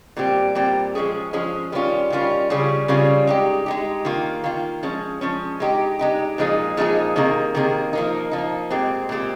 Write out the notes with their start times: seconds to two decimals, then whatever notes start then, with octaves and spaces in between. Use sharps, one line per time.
0.17 A#2 G3 C4 G4
0.55 A#2 G3 C4 G4
0.95 F3 G#3 C#4 G#4
1.33 F3 G#3 C#4 G#4
1.72 D#3 G3 C#4 F4
2.10 D#3 G3 C#4 F4
2.50 C#3 G3 C#4 F4 G#4
2.88 C#3 G3 C#4 F4 G#4
3.27 G#3 D#4 G4
3.66 G#3 D#4 G4
4.05 D#3 A#3 F4
4.44 D#3 A#3 F4
4.83 F3 G#3 C#4
5.21 F3 G#3 C#4
5.60 G#3 D#4 G4
5.99 G#3 D#4 G4
6.38 A#2 F3 G#3 D#4 G#4
6.77 A#2 F3 G#3 D#4 G#4
7.16 C3 D#3 A#3 D#4 G#4
7.55 C3 D#3 A#3 D#4 G#4
7.93 F3 A#3 D#4
8.32 F3 A#3 D#4
8.70 A#2 G#3 C4 G4
9.09 A#2 G#3 C4 G4